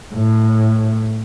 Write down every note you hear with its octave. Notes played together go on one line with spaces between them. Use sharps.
A2